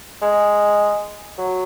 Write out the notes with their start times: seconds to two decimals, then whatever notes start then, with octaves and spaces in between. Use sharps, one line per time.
0.22 G#3
1.38 F#3